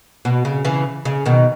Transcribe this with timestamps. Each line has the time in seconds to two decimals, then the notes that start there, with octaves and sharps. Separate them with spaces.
0.25 B2
0.45 C#3
0.65 C#3 E3
1.05 C#3
1.26 B2 D#3